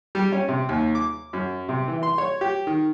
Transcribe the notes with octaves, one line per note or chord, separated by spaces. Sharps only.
G3
C#4
C3
D#2
D6
F#2
C3
E3
C6
C#5
G4
D#3